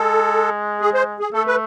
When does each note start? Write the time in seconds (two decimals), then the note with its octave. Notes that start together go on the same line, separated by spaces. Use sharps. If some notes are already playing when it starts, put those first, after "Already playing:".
Already playing: G#3 A4
0.81 G#4
0.94 C5
1.20 G#4
1.33 A3 A4
1.47 B4